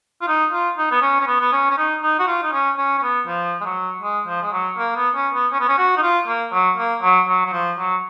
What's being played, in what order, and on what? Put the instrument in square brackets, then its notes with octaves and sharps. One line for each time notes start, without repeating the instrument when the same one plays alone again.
[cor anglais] F4
D#4
F4
D#4
B3
C#4
C#4
B3
B3
C#4
C#4
D#4
D#4
F#4
F4
D#4
C#4
C#4
C#4
B3
F3
G#3
F#3
G#3
F3
G#3
F#3
A#3
B3
C#4
B3
C#4
B3
C#4
F#4
D#4
F4
A#3
F#3
A#3
F#3
F#3
F#3
F3
F#3